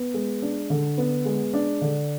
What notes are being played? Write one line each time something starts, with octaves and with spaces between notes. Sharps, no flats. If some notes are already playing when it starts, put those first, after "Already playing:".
Already playing: B3
G#3
D4
D3
B3
G#3
D4
D3